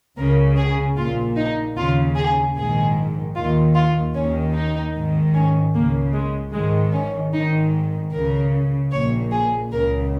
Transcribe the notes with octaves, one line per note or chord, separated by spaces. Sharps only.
C#2 C#3 A#4
G#4
A#1 A#2 F4
D#4
D#2 C#3 F4
G#4
A#1 G#2 D#3 G#4
D#2 D#3 F4
F4
D#2 D#3 C#4
D#4
G#1 G#2 D#3
C#4
C#2 C#3 A#3
G#3
G#1 G#2 D#3 G#3
C#4
G#1 G#2 D#3 D#4
C#2 C#3 A#4
A#1 A#2 C#5
G#4
C#2 C#3 A#4